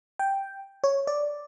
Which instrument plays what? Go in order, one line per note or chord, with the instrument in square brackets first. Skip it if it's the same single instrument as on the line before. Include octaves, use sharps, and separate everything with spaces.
[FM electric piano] G5
C#5
D5